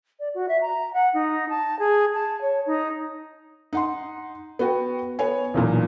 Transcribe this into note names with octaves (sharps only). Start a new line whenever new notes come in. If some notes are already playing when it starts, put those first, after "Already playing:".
D5
F#4
E5
A#5
F#5
D#4
A5
G#4
A5
C#5
D#4
D#4 F#5 C6
B3 F#4 G5
B3 C#5 G#5
B1 E2 A#2